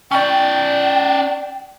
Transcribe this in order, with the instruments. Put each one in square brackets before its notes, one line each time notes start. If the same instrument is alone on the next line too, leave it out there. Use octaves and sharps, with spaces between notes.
[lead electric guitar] C#4 D5 [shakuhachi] G5